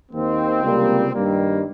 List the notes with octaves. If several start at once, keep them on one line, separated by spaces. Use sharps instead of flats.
D#2 D#3 A#3 C4
C#2 C3 G3 A#3
G2 D#3 G3 A#3